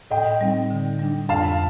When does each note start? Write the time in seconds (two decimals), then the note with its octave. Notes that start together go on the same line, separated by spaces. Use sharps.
0.11 A2 D#5 G5
0.41 G3 C4 D#4
0.71 D3
1.00 G3 D4
1.29 F2 F5 A5